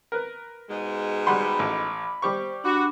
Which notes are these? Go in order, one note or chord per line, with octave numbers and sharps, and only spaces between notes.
A#4 B4
G#2 B2 G#3
G3 F#5 B5 C6
A1 D6
G3 G4 C5 C#6
D4 F#4 B5 D6